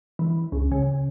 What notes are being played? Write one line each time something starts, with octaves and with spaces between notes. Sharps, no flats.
E3
C#2
C#3